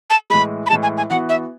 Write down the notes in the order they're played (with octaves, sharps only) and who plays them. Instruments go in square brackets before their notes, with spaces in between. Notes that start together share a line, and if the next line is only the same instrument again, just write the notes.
[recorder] A5
[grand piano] A2 E3 G#3 [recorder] B5
[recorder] B5
[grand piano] A2 E3 G#3 [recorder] A5
[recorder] G#5
G#5
[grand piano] E3 B3 F#4 [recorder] F#5
[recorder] E5